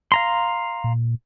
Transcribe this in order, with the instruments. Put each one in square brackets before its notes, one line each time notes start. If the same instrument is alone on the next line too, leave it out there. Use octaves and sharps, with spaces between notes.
[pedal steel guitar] F5 A#5 C6
[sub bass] A#2